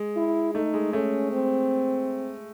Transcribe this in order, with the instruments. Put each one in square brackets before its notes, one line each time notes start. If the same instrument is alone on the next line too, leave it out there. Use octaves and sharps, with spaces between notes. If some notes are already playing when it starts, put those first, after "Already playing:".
Already playing: [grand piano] G#3
[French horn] E4
[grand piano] A3 [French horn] D#4
[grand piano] G#3
[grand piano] A3 [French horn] C#4
[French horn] C4